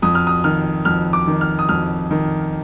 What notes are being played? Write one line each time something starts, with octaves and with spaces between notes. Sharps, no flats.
F2 D#6
F6
D#6
D#3 F6
F2 F6
D6
D#3
F6
D#6
F2 F6
D#3